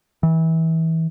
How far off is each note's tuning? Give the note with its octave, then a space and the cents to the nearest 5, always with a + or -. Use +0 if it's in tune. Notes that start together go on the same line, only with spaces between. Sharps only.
E3 -25